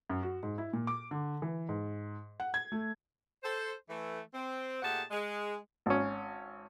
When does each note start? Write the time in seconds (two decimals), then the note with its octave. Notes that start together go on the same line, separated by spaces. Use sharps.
0.09 F#2
0.23 F#4
0.43 G#2
0.58 E4
0.73 A#2
0.87 D6
1.11 D3
1.42 E3
1.69 G#2
2.40 F#5
2.54 G#6
2.72 A3
3.43 A4 C5
3.90 E3 A3
4.34 C4
4.82 A#2 A3 G4 G#4 F#5 A5
5.11 G#3
5.86 G#1 C#4